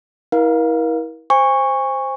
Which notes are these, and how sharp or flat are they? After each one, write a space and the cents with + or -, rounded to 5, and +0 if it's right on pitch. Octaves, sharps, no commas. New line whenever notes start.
E4 -30 A#4 +35 F5 +15
C5 +0 G#5 -35 C#6 +0